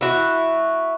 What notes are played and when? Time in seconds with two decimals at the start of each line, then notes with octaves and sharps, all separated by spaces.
0.01 E4 F#4